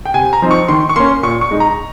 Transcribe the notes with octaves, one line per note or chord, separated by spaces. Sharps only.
G5
C3 G#5
A#5
F3 C4 D#4
C#6
D#3 C6
C#6
A#3 C#4 C6
A#2 C#6
C#6
G#3 D#4
A#5